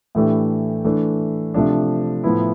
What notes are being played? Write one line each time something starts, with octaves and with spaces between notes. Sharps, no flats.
A2 E3 A3 D4 G4
E3 A3 D4
C3 F3 A3 D4
A2 F3 B3 E4